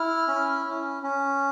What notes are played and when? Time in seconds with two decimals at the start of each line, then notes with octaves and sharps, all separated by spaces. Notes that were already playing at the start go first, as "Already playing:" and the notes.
Already playing: E4 F6
0.28 C#4
0.66 C#4
1.03 C#4